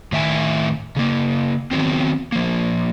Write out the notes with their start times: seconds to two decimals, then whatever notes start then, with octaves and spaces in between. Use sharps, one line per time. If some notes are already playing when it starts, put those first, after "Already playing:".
0.12 A2 D#3 E5 G5 G#5
0.96 C#3 A#3
1.71 D#3 F#3 B3 C4
2.32 F3 A#3